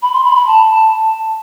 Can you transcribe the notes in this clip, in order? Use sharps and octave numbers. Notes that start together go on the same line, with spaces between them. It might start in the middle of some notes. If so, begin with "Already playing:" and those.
B5
C6
B5
B5
A5